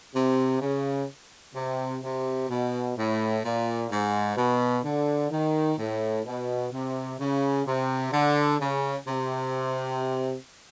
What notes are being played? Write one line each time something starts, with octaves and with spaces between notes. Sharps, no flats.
C3
C#3
C3
C3
B2
A2
A#2
G#2
B2
D3
D#3
A2
B2
C3
C#3
C3
D3
C#3
C3